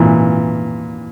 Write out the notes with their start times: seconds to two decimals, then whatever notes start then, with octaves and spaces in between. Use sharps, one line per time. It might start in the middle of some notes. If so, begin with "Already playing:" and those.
Already playing: A#2 E3